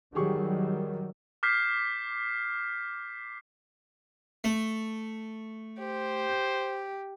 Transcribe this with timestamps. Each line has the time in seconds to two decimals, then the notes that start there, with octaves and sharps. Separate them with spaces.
0.15 D#3 F#3 G3 G4 G#4 C#6
1.43 D6 F6 G6 B6 C7
4.44 A3
5.79 G4 C5